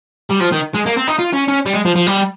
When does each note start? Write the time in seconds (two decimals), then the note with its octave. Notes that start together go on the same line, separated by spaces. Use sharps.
0.31 G3
0.41 F3
0.53 D#3
0.75 G#3
0.86 A#3
0.96 C4
1.07 D#4
1.19 F4
1.34 C#4
1.48 C#4
1.66 G3
1.73 G#3
1.85 F3
1.96 F3
2.07 G3